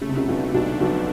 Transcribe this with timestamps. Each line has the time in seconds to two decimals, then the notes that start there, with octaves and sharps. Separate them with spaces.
0.01 C#3 A3
0.09 C3
0.17 C#2 C#3
0.28 B1 B2 D3
0.54 B1 B2 D4
0.80 B1 B2 F3